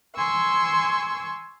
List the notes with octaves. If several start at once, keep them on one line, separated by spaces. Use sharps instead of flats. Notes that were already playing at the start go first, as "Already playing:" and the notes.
G#5 C6 C#6 E6